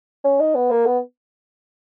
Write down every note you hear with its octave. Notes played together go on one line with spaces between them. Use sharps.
C#4
D#4
B3
A#3
B3